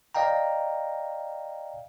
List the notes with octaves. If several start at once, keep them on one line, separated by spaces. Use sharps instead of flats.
D5 D#5 F5 G5 A#5